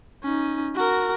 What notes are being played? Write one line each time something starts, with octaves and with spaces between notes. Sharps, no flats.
C#4 D#4
F#4 A#4